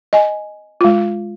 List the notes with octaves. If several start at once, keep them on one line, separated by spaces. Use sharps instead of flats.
D#5 G#5
G#3 F4